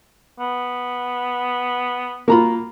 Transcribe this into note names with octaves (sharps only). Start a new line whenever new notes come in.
B3
A#3 F4 F#4 A#5 B5